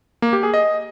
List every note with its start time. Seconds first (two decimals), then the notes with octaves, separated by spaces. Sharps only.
0.22 A#3
0.33 G4
0.43 G#4
0.54 D#5